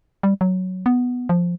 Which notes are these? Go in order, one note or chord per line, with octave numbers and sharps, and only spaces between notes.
G3
F#3
B3
F3